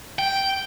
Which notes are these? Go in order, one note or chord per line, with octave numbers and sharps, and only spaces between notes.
G5